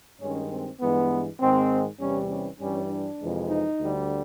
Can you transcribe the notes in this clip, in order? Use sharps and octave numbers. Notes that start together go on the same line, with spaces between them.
G2 D#3 G#3 C#4
C4
G2 E3 G#3 B3
G#2 D#3 G#3 C4
E2 C3 E3 G3 C#4
C#4
G2 E3 G3 C#4
D4
F2 C3 E3 G#3
D#4
D2 D3 G3